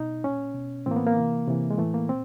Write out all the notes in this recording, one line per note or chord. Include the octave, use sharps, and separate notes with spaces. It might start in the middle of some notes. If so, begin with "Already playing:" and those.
Already playing: B2 D#4
A#2 C#4
B2
A2 E3 A#3 C4
B3
A#3
C3 E3
C3 E3
G#3
A2 E3 A3
A#3
A#2 C4